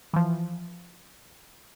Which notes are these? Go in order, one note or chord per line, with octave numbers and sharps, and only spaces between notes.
E3 F3